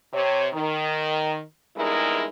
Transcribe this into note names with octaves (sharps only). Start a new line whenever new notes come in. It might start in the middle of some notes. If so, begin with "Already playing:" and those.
C3 C#5
D#3
E2 G2 G#3 D#4 E4 A#4